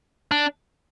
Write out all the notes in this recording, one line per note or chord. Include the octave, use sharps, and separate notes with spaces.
D4